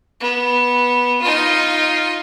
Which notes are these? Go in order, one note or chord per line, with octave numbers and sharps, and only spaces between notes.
B3
D#4 F4